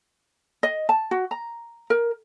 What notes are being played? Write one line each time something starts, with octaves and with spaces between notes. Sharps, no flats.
D#5
A5
F#4
A#5
A#4